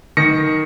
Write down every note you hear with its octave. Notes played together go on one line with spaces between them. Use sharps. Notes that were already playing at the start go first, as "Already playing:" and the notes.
D#3 A#6 C#7